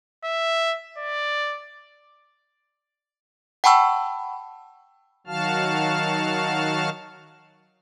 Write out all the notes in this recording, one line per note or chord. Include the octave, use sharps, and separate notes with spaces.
E5
D5
F#5 G5 A5 B5 C#6 E6
D#3 F#3 F#4 F5 A5 F6